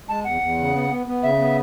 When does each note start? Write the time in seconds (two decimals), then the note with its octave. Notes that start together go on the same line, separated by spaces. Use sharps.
0.08 G#3 A5
0.24 E2 F#5
0.41 E2
0.57 C#3
0.74 B3
0.90 B3
1.07 B3
1.23 C#3 E5
1.39 B3